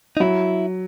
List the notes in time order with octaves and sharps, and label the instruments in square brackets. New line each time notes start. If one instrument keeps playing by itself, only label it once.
[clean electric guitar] D#4
[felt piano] F#3 [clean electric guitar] E4